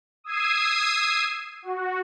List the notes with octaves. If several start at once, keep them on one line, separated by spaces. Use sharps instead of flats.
D#6 E6 G#6 C7 D#7
F#4